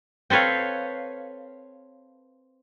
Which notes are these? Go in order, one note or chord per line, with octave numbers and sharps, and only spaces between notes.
C4 A4 B4 C#5 F5